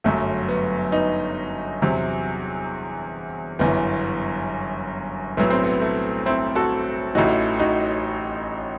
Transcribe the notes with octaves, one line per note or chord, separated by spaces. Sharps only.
G1 F#2 F#3 A3
B3
B3 D#4
E2 C3 F#3
G1 F#2 E3 B3
B1 A2 F#3 B3
C4
B3
A3
C4 E4
F#4 A4
A1 A2 E3 D#4 F#4
D#4 F#4